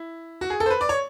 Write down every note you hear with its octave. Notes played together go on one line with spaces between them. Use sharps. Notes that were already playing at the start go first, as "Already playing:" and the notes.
Already playing: E4
F#4
G#4
A4
C5
B4
D5
C#5